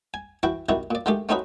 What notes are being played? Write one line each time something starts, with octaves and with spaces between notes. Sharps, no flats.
G#5
E3 E4 F#4 G5
C3 D#3 G3 E4 F#4
A#2 D5
D3 D#3 G#3 A3 G4
A3 C4 C#4 D#4 F#4 B4